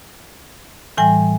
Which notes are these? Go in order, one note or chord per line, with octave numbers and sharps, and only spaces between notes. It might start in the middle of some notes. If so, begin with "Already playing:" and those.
A2 E3 G3 G#5